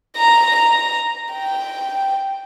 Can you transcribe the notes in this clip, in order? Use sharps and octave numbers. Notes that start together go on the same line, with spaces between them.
A#5
A#5
G5